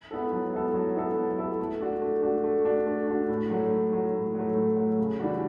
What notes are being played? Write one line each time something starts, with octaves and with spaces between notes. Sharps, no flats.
B3 E4 A4
F#3
B3 E4 A4
F#3
B3 E4 A4
F#3
B3 E4 A4
A3
D4 F#4
A3
D4 F#4
A3
D4 F#4
A3
D4 F#4
A2
F#3 A3
A2
F#3 A3
A2
F#3 A3
A2
F#3 A3
C#3
E3 G3 D4 F#4